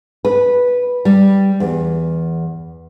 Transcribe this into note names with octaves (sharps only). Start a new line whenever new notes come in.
B4
G3
E2